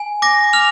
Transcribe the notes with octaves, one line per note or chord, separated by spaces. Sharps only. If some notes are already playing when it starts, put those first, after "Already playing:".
Already playing: G#5
D6 A#6
F6 F7